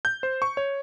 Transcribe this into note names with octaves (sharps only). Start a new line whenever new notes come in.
G6
C5
C#6
C#5